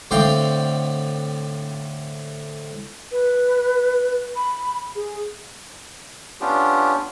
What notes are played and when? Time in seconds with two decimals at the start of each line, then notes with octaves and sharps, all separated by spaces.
0.11 A2 D3 C4 F5 G5
3.12 B4
4.36 B5
4.95 G#4
6.41 B3 C#4 D4 F4 G4